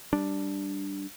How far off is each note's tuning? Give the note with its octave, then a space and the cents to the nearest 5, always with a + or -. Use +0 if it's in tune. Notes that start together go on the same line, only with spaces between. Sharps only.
G3 +0 D4 +0